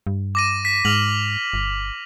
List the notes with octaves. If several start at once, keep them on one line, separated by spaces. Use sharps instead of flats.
G2
D6 A#6 D#7
B6
G#2 F6 F7 F#7
G1